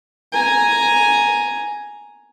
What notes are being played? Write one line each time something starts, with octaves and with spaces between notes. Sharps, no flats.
G#5 A#5